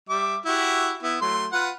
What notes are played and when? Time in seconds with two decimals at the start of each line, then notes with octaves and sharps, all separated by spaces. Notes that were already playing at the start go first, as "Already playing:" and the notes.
0.09 G3 E5 D6
0.45 E4 F#4 G4
1.03 B3 E4
1.21 F#3 A3 C6
1.52 F4 B4 F#5